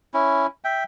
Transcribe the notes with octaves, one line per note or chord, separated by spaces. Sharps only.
C#4 E4
E5 G5